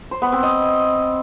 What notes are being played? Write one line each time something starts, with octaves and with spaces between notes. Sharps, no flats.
C5
B3
C4
D#5